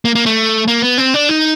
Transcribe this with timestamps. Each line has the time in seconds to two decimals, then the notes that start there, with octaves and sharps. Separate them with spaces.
0.05 A#3
0.15 A#3
0.26 A3
0.68 A#3
0.82 B3
0.98 C4
1.14 D4
1.29 D#4